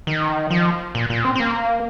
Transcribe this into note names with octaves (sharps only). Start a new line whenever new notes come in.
D#3
F3
A#2
A#2
C4
C4
A#3